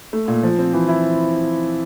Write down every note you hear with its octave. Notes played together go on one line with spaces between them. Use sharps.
A3
A#2
F3
C4
E3
E4